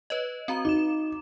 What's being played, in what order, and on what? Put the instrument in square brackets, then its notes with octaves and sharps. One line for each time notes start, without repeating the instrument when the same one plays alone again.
[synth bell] B4 C#5 D#5
C4 F#4 A#5
[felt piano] D#4 [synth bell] D6 E7